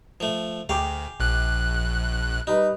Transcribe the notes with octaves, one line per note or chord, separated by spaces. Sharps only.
F3 A3
D2 G#4 F5 G5 D6
A#1 F#6
G3 D#4 B4